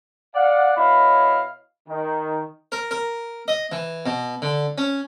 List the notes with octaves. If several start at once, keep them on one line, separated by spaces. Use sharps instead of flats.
D5 F5 F#5
B2 E4 C#5 D#5 F5 B5
D#3
A#4
A#4
D#5
E3
B2
D3
C#4